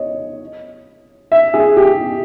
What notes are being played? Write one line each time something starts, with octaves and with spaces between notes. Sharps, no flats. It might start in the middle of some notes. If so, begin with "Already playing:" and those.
Already playing: C#5 D#5
E5
G#4
G4